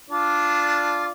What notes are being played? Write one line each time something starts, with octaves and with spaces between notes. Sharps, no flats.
D4 F4 D5